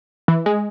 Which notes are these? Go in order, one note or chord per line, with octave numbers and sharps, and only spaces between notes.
E3
G#3